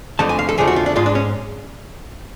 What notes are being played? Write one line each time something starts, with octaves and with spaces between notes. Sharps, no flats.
F2 D3 F3 A3 A5
G#5
F5
A4
F2 D3 F3 A3 G#4
F#4
F4
D4
G#2 G#3 F4
D4
C#4